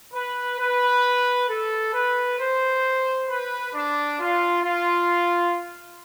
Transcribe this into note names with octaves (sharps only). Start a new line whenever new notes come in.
B4
B4
A4
B4
C5
B4
D4
F4
F4